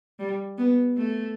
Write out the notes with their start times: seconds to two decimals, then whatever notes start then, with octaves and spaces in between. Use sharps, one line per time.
0.19 G3
0.58 B3
0.97 A3